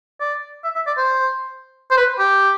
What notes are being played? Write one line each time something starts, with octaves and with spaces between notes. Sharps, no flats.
D5
E5
E5
D5
C5
C5
B4
G4